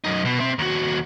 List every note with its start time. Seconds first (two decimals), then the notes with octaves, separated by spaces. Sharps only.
0.04 F#2 D#4
0.25 B2
0.40 C4 E5
0.59 D#2 F#4